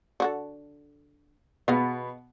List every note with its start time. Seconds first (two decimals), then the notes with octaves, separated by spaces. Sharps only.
0.20 D3 F#4 A4
1.68 B2 B3 G#4 D#5 F5